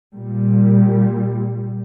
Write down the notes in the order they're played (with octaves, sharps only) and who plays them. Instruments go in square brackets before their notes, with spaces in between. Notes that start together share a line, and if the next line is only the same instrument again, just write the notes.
[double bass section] A#2 G3